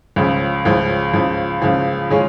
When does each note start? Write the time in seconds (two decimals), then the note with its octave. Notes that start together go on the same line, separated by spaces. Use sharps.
0.16 C#2 C#3 F3
0.65 C#2 C#3 F3
1.13 C#2 C#3 F3
1.62 C#2 C#3 F3
2.11 C#3 G#3 C#4 F4